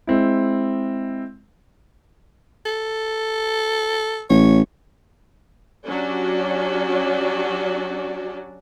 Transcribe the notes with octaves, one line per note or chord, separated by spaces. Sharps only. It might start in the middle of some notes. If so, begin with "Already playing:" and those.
G#3 C4 E4
A4
A1 C#5
F#3 C#4 D4 F#4 G4 D5